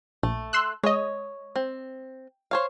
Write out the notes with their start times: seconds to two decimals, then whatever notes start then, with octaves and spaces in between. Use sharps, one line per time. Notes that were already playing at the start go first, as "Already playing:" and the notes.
0.23 A#1 A3
0.53 C6 E6 F#6
0.84 G#3 C#5 D#5
1.56 C4
2.51 C5 C#5 F5